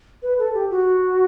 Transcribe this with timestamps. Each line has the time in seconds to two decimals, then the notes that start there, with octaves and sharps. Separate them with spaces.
0.23 B4
0.39 A4
0.54 G4
0.70 F#4